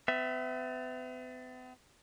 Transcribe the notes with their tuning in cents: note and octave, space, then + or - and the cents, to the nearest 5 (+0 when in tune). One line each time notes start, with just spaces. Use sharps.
B3 +45 E5 +5